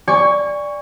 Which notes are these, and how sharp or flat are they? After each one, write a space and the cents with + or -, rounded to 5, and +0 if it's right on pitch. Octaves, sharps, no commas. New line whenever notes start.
D5 +0 G#5 -35 C#6 +10